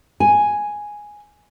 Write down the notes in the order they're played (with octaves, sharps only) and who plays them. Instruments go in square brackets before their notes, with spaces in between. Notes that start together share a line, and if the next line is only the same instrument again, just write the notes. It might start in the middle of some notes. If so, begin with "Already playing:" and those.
[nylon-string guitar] G#5